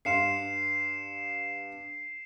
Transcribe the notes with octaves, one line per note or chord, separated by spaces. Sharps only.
G2 F5 C6 C7 C#7 E7